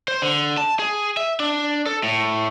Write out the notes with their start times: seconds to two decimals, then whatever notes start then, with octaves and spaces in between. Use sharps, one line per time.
0.08 C5
0.22 D3
0.57 A5
0.79 G#4
1.17 E5
1.40 D4
1.86 A4
2.03 A2